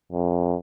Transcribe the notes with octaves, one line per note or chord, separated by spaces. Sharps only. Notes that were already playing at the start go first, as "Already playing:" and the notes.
F2